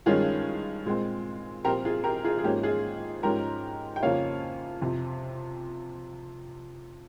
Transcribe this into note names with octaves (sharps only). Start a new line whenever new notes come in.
G2 D#3 G#3 C#4 F4 G#4
A#2 G#3 C4
A#2 F3 C4 G4 A#4
F4 G#4
G4 A#4
F4 G#4
G#4
G#2 F3 A#3 C#4 G4
F4 G#4
G#2 F3 G#3 C#4 G4 A#4
G5
F2 C#3 F3 A#3 C#4 C#5 F5
F2 C3 F3